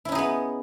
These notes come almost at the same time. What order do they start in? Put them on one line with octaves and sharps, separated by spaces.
E4 C#4 D#4 G#4 B3